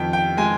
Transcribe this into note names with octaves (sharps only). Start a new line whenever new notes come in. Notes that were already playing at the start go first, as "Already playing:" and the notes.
Already playing: F2 D#3 G5
G5
G#3 G#5